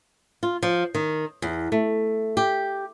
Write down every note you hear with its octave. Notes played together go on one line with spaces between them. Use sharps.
F4
F3
D#3
E2
A3
G4